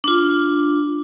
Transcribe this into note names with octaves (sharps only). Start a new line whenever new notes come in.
D4 F4